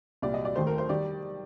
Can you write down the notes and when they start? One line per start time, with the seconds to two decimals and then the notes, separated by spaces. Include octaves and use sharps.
0.22 C2 A#2 G3 D5
0.34 D#5
0.45 D5
0.56 D#2 D#3 A3 C5
0.67 A#4
0.78 C5
0.89 D#3 G3 D5